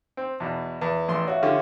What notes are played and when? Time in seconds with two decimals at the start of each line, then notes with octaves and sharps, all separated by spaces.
0.17 C4
0.40 E2 B2
0.82 E2 B4
1.08 A1 E2 C6
1.28 F#4 C#5 E5 F5
1.43 D3 C#4 F4 G4 G5